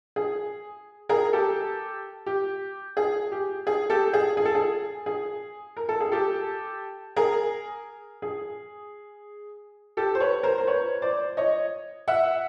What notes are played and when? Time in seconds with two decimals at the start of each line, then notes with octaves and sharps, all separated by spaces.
0.16 G#4
1.09 G#4 A#4
1.33 G4 A4
2.26 G4
2.97 G#4
3.32 G4
3.67 G#4
3.90 G4 A4
4.13 G#4
4.37 G#4
4.45 A4
4.55 G#4
5.06 G#4
5.77 A#4
5.89 A4
6.00 G#4
6.12 G4 A4
7.16 G#4 A#4
8.22 G#4
9.97 G4 A4
10.15 C5
10.20 B4 C#5
10.43 A#4 C5
10.58 C5
10.67 B4 C#5
11.02 C5 D5
11.37 C#5 D#5
12.08 E5 F#5